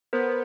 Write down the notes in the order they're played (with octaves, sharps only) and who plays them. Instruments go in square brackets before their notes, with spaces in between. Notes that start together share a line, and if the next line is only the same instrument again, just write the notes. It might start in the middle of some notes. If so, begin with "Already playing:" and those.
[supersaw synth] B3 [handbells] A#4 C5